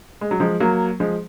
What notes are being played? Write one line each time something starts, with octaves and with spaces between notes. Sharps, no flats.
G#3
F#3
F3 G#3
F#3 A#3
F3 G#3